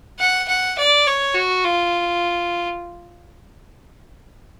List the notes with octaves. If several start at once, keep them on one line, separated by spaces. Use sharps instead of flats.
F#5
F#5
D5
C#5
F#4
F4